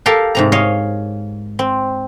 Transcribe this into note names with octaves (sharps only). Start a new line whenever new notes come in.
G4 A4 A#4 F5 G5
G#2 C3 A#5
C#5 D#5 F5
C4